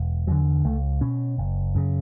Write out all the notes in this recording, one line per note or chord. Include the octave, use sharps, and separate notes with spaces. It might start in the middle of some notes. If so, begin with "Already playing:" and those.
Already playing: E1
E2 D3 F#3
C#2 A3
B2 C#4
F#1
F#2 C#3